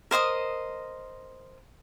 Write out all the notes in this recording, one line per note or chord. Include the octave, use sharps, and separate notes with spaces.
A#4 C5 D#5 D#6